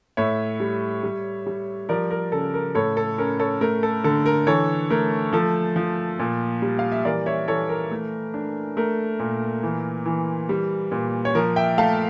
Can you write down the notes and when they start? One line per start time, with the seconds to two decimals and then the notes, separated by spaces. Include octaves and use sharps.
0.17 A2 C#5 E5
0.60 G3
1.03 G3
1.46 G3
1.89 F3 A#4 D5
2.11 A#4
2.32 C#3 A4
2.54 A#4
2.75 A2 A4 C#5
2.97 A4
3.18 C#4 A#4
3.39 A4 C#5
3.61 A3 A#4
3.83 A4
4.04 D3 A4
4.26 A#4
4.47 E3 A4 C#5
4.90 A3 A#4
5.33 F3 A4
5.76 F3
6.19 A#2
6.62 G3
6.79 F5
6.92 E5
7.05 E3 A#4 D5
7.26 C#5 E5
7.48 E3 A4 C#5
7.69 A#4
7.91 A3
8.34 D4
8.77 A3 A#4
9.19 A#2
9.63 E3
10.06 E3
10.49 G3
10.92 A#2
11.25 C#5
11.35 F3 A#4
11.56 E5 G5
11.78 A3 F5 A5